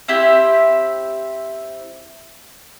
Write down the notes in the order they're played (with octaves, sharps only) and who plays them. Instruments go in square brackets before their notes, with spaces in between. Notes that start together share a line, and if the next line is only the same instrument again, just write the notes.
[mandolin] C4 E4 G4